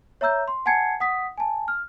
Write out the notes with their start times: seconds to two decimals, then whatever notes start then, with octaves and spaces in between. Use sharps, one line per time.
0.21 C#5 E5 A#5 E6 G6
0.48 C6
0.66 F#5 G#5 A5 G#6 C7 C#7
1.00 F#5 D#6 B6
1.38 G#5 A5
1.68 F6